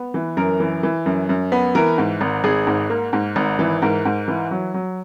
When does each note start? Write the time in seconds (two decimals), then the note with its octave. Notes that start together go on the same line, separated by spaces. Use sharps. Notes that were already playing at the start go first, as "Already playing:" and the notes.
Already playing: B3
0.14 E3
0.37 F#2 A#4
0.60 E3
0.83 E3
1.06 F#2
1.29 F#2
1.52 B3
1.75 E3 A#4
1.98 G#2
2.21 G#1
2.44 G#1 G#4
2.67 G#2
2.90 A#3
3.13 G#2
3.36 G#1
3.59 E3
3.82 G#2 A#4
4.05 G#2
4.28 E3
4.51 F#3
4.74 F#3